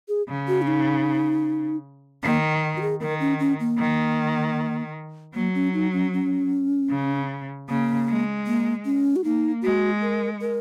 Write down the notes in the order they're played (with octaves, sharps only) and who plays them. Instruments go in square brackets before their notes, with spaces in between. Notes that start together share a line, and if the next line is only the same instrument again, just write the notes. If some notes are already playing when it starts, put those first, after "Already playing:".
[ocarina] G#4
[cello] C#3
[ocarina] F#4
C#4
D#4
[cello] D#3 [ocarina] A#3
[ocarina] F#4
G#4
[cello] D#3 [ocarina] A#4
[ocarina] C#4
C#4
A#3
[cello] D#3
[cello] F#3 [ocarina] A#3
[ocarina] C#4
D#4
C#4
C#4
[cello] C#3
[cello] C#3 [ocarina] A#3
[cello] G#3
[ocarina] A#3
C#4
F#4
[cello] A#3 [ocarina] D#4
[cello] G#3 [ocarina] F#4
[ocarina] A#4
A#4